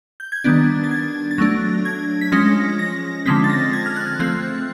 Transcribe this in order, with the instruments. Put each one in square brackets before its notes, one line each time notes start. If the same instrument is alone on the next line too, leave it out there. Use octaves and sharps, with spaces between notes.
[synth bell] G6
G#6
D#3 G3 B3 D4 A6
A6
G#6
A6
F#3 A3 D4 A#6
G#6
B6
F3 G#3 C#4 A#6
A#6
D3 F3 G#3 C4 B6
A6
A#6
G#6
F6
F#6
F3 A3 C4 F#6